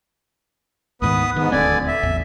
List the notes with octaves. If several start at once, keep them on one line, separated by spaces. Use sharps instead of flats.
D2 G#2 D#3 B3 B4 D#6
G#2 D#3 B3
D#1 D2 D3 C4 D5 G#5
E5
A1 E2